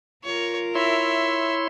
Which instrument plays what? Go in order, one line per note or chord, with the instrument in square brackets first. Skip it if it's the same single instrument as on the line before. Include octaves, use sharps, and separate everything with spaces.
[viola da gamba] F4 A#4 [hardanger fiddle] C#5
[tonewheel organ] E4 C#5 C6 [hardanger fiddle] E5